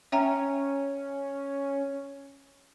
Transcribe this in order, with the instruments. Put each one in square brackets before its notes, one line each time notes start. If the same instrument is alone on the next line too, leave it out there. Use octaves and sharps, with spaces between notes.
[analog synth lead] C#4 [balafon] E5 G5 A#5